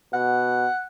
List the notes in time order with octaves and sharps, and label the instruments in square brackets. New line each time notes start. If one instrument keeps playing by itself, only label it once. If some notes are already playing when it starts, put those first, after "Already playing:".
[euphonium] B2 [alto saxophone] F#5